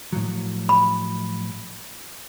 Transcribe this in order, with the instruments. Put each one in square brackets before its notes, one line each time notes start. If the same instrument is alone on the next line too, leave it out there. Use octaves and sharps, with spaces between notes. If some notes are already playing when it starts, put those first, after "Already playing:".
[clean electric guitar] A2 F3 F#3
[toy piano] B5